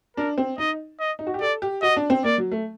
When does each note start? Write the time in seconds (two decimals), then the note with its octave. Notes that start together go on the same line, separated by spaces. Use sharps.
0.17 D4 A#4
0.38 C4
0.58 D#4 D#5
1.00 D#5
1.19 D#4
1.27 F#4
1.34 G4
1.41 A4 D5
1.62 G4
1.82 F#4 D#5
1.96 D4
2.10 C4
2.24 A#3 D5
2.38 F#3
2.52 A3